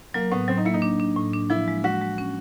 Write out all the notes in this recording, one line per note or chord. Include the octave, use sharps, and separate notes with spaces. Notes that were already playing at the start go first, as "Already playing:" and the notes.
F#3 A#3
A2 B3
F#3 C4
D#4
A#3 E4
D#4
D4
D4
A2
D4
F3 E4
G#3
G#3 F#4
G#3
C#4